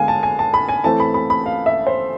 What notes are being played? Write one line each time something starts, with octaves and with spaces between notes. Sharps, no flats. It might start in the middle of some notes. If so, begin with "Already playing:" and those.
Already playing: D3 G#3 B3 F5 G#5
A5
G#5
A5
B5
G#5
E3 A3 C4 A5
B5
B5
B5
F5
E5
C5